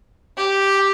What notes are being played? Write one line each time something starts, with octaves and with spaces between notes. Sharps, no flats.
G4